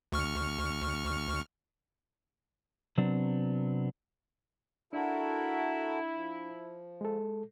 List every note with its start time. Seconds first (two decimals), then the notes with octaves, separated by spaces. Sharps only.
0.12 D2 C#6 F6
2.98 C3 F#3 B3 C4 D4
4.93 D4 E4 F#4 A4 A#4
6.12 F3
7.01 G#3 A4